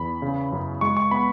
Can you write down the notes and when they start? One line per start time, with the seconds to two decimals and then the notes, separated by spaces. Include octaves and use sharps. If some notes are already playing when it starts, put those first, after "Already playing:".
Already playing: E2 B5
0.22 C#3
0.52 F#2
0.81 G#3 C#6
0.97 C#6
1.11 B3 B5